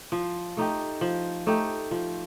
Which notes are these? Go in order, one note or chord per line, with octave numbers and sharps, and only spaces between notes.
F3
A3 D#4 G4
F3
A3 D#4 G4
F3